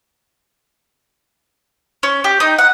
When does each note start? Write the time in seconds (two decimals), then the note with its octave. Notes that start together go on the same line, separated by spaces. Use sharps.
2.03 C#4
2.24 G4
2.40 D#4
2.59 F#5